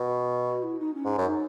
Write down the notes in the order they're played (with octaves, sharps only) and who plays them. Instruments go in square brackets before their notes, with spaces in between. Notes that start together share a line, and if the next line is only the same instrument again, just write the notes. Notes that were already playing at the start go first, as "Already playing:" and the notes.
Already playing: [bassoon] B2
[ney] F#4
E4
D#4
C#4
[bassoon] G#2
F#2
[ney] D#4